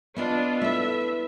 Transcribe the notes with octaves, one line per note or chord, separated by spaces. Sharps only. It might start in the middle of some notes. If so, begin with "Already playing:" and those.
B3 D4 F4 D5 D#5
A3 E4 B4 E5